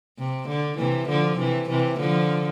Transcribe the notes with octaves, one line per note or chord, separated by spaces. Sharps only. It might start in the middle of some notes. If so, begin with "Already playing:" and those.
C3
D3
C3 E3
D3 F3
C3 E3
C3 E3
D3 F3